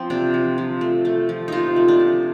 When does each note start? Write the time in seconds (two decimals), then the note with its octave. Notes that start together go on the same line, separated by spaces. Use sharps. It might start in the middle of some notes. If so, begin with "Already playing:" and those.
Already playing: F3 C4
0.10 C3 D4
0.34 F3
0.58 F3
0.81 A3
1.05 A3
1.29 F3
1.48 C3 D#4 F4
1.76 A3
1.88 D4
2.00 F3